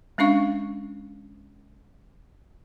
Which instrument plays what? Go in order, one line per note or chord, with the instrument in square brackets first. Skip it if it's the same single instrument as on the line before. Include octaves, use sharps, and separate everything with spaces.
[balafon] G#3 C#4 D4 F5 C#6